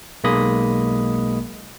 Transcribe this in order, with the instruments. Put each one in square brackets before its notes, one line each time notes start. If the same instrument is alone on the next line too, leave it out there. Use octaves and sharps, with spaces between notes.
[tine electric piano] B1 G#3 A#3 D#5 B5 D#6